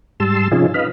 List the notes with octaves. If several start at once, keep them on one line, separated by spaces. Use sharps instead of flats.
G#2 G3 A5 C6 E6
C3 F3 C#4 D#4 F4 G#4
B4 D#5 F5 B5